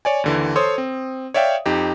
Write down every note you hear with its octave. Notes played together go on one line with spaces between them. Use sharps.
C#5 D5 G#5
D#2 D3 E3
A4 C5 C#5 C6 D#6
C4
C#5 D5 E5 F5 G5
F2 D#4 G4 G5